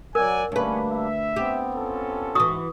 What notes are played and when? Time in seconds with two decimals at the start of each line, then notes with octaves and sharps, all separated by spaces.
0.15 F#3 A#4 D5 F#5 G#5
0.52 D2 G3 A#3 C#4 D4 B4
0.91 E5
1.36 B3 C4 G4
1.75 C#4 F4 A4
2.35 G#2 E3 F#4 C#6 D#6